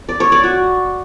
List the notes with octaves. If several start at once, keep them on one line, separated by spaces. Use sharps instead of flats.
D5
C#5
D5
F#4